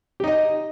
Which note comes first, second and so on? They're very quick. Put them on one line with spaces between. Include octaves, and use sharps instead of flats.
G4 D#4 D#5